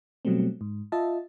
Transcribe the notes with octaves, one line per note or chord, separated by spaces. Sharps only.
B2 F#3 G3 A3 C4
G#2
F4 D#5 E5 A5